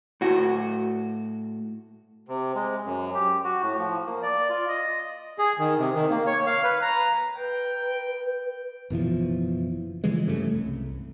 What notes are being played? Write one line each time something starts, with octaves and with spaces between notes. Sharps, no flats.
A2 F#4
C3
G#3
F#2
G4
F#4
A2
F3
A#3
D5
F4
D#5
G#4
D#3
C3
D#3
A#3
C#5
F5
B4
A#5
B4 G5
F#1 B2 E3 F3
C#3 E3 F3 G#3
G2 C#3 A3
C2